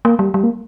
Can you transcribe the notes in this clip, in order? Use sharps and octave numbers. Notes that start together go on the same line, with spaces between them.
A#3
G3
G3
A#3